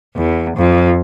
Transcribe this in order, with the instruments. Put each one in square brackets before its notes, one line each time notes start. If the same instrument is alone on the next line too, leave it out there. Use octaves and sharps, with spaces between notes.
[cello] E2
F2